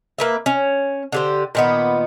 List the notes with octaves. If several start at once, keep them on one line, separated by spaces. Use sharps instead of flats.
A#3 B4 E5
C#4
D3 G4 C5
A#2 D#3 B3